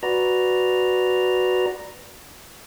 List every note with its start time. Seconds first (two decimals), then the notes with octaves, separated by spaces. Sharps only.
0.03 F#4 B4 D5 A#5